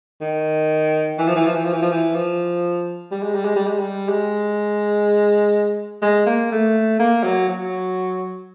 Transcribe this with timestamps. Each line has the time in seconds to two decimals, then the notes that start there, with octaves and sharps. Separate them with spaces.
0.21 D#3
1.18 E3
1.27 F3
1.35 E3
1.46 F3
1.55 E3
1.64 F3
1.73 E3
1.82 F3
1.91 E3
2.14 F3
3.11 G3
3.22 G#3
3.34 G3
3.45 G#3
3.56 G3
3.67 G#3
3.79 G3
4.09 G#3
6.02 G#3
6.26 A#3
6.51 A3
6.99 A#3
7.23 F#3
7.48 F#3